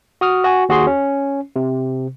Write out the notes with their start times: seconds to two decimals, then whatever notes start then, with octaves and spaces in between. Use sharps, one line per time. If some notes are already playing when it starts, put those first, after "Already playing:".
0.21 F#4 D#6 F6
0.44 F#4 G#5
0.69 D#2 F#4 G#4 C6
0.87 C#4
1.56 C3